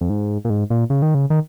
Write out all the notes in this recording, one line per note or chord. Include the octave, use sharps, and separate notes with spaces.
F2
G#2
A#2
G#2
A#2
C#3
D#3
C#3
D#3